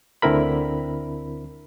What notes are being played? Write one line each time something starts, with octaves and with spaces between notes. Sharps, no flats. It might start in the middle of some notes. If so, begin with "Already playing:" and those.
D2 D3 C4 E4 A#4 B5